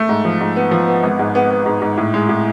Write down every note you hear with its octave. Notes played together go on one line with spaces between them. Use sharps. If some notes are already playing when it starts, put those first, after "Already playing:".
Already playing: A3
G#2
F3
G#2
B3
F3
B3
G#1
G#2
B3
B3
G#2
G#2
A2
G#3
A2